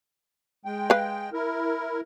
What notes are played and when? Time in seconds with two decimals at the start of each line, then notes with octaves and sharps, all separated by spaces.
0.65 G#3 G5
0.90 B4 F5
1.33 E4 A#4